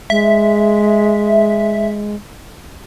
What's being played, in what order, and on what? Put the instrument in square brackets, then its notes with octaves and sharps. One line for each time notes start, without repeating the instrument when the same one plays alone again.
[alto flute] G#3 [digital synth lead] E5